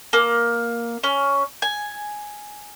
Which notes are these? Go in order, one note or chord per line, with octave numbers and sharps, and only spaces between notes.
A#3
C#4
G#5